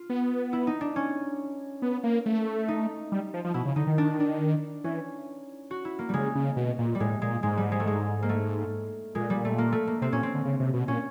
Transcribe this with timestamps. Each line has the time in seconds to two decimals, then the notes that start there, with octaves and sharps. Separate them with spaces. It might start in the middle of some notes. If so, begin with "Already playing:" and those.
Already playing: F4
0.10 B3
0.53 E4
0.67 D#4
0.81 D4
0.96 C#4
1.82 B3
2.04 A#3
2.26 A3
2.68 D#4
3.12 G3
3.34 F3
3.44 F3
3.54 B2 E4
3.65 C#3
3.76 D3 D#4
3.87 D#3
3.98 D4
4.20 D4
4.84 E3 C#4
5.71 F#4
5.85 E4
5.99 A#3
6.09 C#3 G3 G#3
6.35 C#3
6.56 B2
6.79 A#2
6.95 G3
7.00 A2 G#3
7.22 A#2 G#3
7.43 G#2 G#3
7.58 G3
7.72 G#3
7.80 A3
7.87 G#3
8.22 A#3
8.29 A3
9.15 A#2 G#3
9.30 G3
9.45 A3
9.58 A#3
9.72 A3
9.87 A#3
10.02 C3 C4
10.12 A#2 C#4
10.23 C4
10.34 D3
10.45 C#3
10.60 C3
10.74 B2
10.88 A#2 C#4